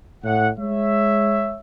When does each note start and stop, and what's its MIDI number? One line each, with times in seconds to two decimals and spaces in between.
0.23 0.49 45
0.23 0.49 78
0.58 1.58 56
0.58 1.58 73
0.58 1.58 76